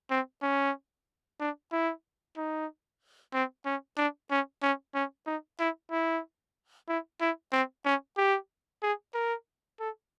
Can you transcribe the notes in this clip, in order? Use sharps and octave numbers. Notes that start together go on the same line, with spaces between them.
C4
C#4
D4
E4
D#4
C4
C#4
D4
C#4
C#4
C#4
D#4
E4
E4
E4
E4
C4
C#4
G4
G#4
A#4
A4